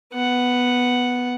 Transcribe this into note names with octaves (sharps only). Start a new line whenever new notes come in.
B3 F#5